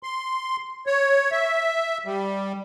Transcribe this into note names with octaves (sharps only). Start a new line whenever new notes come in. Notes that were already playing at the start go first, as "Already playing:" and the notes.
C6
C#5
E5
G3